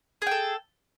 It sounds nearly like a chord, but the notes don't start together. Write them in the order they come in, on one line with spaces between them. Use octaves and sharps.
G#4 G5 A4